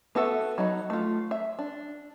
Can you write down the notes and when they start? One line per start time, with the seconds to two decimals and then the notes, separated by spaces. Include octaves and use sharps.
0.15 B3 F#4 A4 E5
0.58 F#3 D#4 D#5 B5
0.90 A3 F4
1.31 E5
1.59 D4